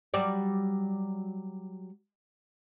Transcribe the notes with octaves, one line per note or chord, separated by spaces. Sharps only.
F#3 G3 D5